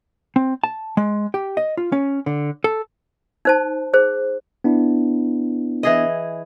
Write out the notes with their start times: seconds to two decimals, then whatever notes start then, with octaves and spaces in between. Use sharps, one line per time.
0.36 C4
0.64 A5
0.97 G#3
1.34 G4
1.57 D#5
1.77 F4
1.92 C#4
2.26 D3
2.64 A4
3.45 D#4 C5 A5
3.93 G#4 C5
4.64 B3 D4 E4
5.83 E3 G#4 D#5